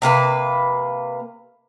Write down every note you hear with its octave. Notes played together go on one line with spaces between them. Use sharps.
C3 A#3 B4 F5